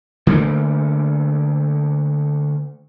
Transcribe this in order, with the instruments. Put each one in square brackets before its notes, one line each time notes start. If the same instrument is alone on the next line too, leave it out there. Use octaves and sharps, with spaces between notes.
[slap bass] D3 A3 A#3